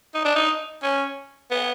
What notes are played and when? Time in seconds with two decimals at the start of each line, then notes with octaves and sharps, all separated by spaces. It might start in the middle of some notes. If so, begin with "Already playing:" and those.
0.15 D#4
0.25 D4
0.35 D#4
0.83 C#4
1.51 B3